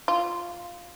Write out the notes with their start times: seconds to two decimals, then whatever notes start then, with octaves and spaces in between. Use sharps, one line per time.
0.08 F4